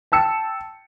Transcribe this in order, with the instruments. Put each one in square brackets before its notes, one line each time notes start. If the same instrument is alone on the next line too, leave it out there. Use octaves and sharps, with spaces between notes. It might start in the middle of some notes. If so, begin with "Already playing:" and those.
[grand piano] G5 A5 E6 C#7